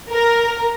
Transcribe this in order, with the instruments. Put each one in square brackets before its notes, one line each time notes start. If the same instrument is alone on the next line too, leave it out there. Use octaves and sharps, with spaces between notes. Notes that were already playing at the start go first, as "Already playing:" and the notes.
[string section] A#4